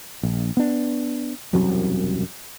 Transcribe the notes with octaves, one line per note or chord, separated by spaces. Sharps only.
A#1
B3 D4
E1 C2 F#2 F#3